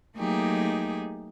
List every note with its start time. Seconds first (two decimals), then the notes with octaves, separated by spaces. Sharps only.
0.16 F#3 A3 A#3 D#4 G4 G#4